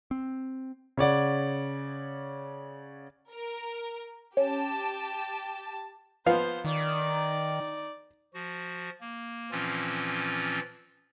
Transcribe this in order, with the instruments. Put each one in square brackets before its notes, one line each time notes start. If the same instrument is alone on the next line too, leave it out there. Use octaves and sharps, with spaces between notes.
[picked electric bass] C4
[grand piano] C#3 C#5 D5 F#5
[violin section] A#4
[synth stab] C#4 [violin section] G4 A5
[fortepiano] F3 B3 F5 [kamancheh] C5
[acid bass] D#3 [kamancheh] D#4 D5
[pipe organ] F3 F#4
A#3
A#2 E3 F3 C4 C#4 F4